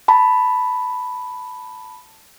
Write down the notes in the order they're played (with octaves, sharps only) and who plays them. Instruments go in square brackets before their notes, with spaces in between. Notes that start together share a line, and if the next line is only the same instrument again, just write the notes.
[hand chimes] A5 B5